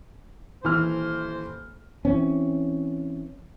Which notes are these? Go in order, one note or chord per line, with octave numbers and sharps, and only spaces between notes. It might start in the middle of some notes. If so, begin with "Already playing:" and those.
D#1 E3 C5 F6
E3 C4 C#4